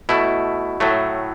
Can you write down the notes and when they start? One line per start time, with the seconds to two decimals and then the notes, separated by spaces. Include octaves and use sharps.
0.09 B2 A3 E4
0.80 A2 F#3 A3